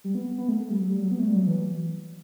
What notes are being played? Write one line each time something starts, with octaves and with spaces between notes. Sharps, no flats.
G3
B3
B3
A3
A3
G3
F#3
G3
F#3
B3
A3
G3
F#3
E3